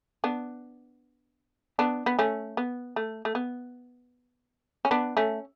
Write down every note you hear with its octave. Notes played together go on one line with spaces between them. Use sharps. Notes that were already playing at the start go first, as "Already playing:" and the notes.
B3 D4
B3 D4
B3
A3 C#4
B3
A3
A3
B3
C#4
B3 D4
A3 C#4